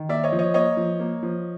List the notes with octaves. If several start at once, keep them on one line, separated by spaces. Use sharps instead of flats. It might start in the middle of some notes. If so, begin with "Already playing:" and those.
Already playing: D#3
A#3 D5 E5
C#5 D#5
F3
C#5 D#5
A#3 C#5 D#5
F3
A#3
F3